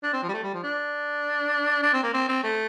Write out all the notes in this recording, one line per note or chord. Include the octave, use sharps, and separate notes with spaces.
D4
C4
F3
G3
A3
G3
F3
D4
D4
C4
A#3
C4
C4
A3